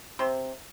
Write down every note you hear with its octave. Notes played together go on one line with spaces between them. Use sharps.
C3 C6